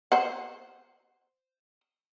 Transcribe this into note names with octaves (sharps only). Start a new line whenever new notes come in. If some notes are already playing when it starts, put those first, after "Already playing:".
C5 F#5